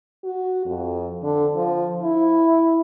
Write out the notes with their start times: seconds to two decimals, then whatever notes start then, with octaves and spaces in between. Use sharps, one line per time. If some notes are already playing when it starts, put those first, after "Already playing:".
0.25 F#4
0.66 F2
1.23 D3
1.56 F3
2.03 E4